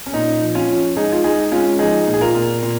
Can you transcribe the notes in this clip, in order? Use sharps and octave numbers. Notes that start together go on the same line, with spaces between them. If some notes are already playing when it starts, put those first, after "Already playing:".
C#4
A#2 D#4
F3
C#4 F4
F3
G#3 D#4 G#4
F4
G#3 D#4 G#4
G#3 C#4 F4
F3 D#4 G#4
A#2
G#4
F4 A#4
A#2
A#2